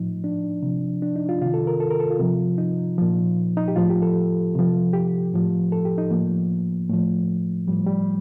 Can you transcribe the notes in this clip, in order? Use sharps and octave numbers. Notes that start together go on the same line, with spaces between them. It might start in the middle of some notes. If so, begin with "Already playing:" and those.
Already playing: A2 F3 D#4
D4
C3 F3
D4
D#4
F4
C3 D#3 F4
A4
A#4
A4
A#4
A4
F4
C3 F3
D#4
A#2 F3
D#4
G4
A2 F3 F4
G4
A4
C3 F3
G4
A2 F3
A4
G4
D#4
A2 F3 A#3
A2 F3 A3
A2 F3 G3
G3